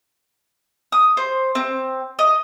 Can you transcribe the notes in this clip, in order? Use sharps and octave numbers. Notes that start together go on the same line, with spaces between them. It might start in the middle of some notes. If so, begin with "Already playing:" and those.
D#6
C5
C4
D#5